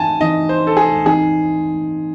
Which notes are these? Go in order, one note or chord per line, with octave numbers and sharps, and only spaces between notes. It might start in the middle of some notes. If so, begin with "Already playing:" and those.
Already playing: E3 C4 D#4 G#5 A5
E3 C4 D#4 D#5
C5
A4
G#4
E3 C4 D#4 G#4